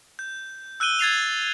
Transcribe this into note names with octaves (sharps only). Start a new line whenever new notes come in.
G6
E6 F#6 G6 D#7 G7
G#6 A6 C7 F7